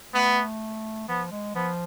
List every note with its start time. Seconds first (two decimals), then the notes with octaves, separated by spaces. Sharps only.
0.13 A3 B3
1.08 F3 B3
1.31 G#3
1.55 F3 B3